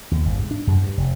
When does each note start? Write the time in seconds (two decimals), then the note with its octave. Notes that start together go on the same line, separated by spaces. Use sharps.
0.11 D#2
0.25 G1
0.38 G#2
0.51 D4
0.67 F#2
0.82 G2
0.97 F1